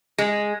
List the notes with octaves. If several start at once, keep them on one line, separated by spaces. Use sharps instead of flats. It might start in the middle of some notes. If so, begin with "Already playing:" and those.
G#3